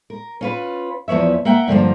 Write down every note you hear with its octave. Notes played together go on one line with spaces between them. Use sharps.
A#4
C#4 F4 B4
E2 F3 B3 C#5 E5
A#3 E5 F#5 G5
G2 D3 F3 A#3